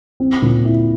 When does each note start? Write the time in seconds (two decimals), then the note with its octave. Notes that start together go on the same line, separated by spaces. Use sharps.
0.20 C4
0.42 A#2
0.65 E4